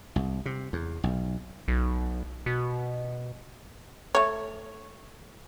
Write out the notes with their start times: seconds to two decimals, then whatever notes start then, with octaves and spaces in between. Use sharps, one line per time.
0.16 C2
0.46 C3
0.73 E2
1.04 B1
1.68 B1
2.46 B2
4.15 A3 C#5